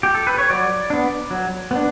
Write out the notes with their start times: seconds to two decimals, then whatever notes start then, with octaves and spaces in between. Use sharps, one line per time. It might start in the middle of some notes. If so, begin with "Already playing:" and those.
0.03 G4
0.15 A4
0.27 B4
0.38 C#5
0.50 F#3 D5
0.90 B3 D4
1.31 F#3
1.71 B3 D4